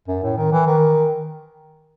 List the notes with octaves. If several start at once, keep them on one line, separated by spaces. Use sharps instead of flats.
F#2
A2
D#3
E3
D#3